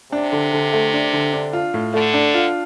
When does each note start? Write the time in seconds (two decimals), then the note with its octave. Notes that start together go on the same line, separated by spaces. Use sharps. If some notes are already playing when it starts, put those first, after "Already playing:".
0.12 C3 D4
0.32 D3
0.53 D3
0.73 A3
0.93 D4
1.13 D3
1.34 D4
1.53 F4
1.74 A2
1.94 D3 A3
2.14 D4
2.34 F4